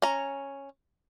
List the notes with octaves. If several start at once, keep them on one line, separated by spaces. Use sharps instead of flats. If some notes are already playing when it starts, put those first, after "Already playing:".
C#4 A#5